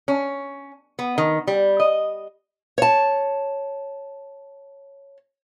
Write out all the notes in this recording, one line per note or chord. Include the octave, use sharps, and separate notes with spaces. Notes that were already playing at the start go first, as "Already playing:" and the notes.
C#4
B3
D#3
G3
D#5
C#5 A5